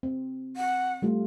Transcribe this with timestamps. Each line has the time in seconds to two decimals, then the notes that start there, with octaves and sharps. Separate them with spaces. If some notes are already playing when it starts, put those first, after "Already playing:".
0.03 C4
0.57 F#5
1.02 G3 A3 F4